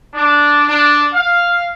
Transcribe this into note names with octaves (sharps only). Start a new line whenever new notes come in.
D4
D4
F5